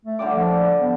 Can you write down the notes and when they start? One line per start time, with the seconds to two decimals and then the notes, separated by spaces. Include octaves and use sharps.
0.05 A3
0.19 D3 G3 D6
0.35 F3
0.80 B3